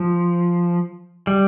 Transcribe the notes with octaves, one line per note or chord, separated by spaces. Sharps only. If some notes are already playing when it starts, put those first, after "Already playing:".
Already playing: F3
G3